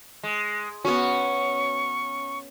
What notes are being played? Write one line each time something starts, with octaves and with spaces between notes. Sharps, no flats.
G#3
B3 C#4 F#4 C#6